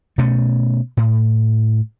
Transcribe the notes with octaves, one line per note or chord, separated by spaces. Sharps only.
B2 A3 C#4
A2